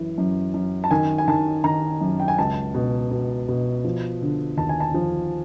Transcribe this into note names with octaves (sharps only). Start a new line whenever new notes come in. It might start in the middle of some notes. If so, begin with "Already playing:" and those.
Already playing: F#2 E3
F#2
F#2
A5
D#3 G#5
G#5
D#3 A5
D#3 A#5
F#2
G5
G#5
C#2 A5
B2
B2
B2
F3
D3
D#2 A5
G#5
A5
F3